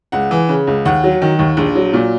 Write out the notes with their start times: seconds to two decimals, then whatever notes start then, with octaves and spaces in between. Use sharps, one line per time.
0.12 C#2 F#5
0.31 E3
0.49 C#3
0.67 C#2
0.85 D#2 F#5
1.04 F#3
1.22 D#3
1.39 D#2
1.57 A#1
1.75 F#3
1.93 A#2